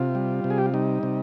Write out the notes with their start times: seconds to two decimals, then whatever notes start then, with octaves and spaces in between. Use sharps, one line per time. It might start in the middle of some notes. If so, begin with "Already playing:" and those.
Already playing: C3 F4
0.15 G3
0.44 C3
0.50 G#4
0.58 G4
0.66 F4
0.74 G3 D#4
1.03 C3